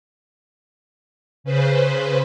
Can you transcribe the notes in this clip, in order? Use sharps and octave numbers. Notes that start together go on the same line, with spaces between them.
C#3 B4 C5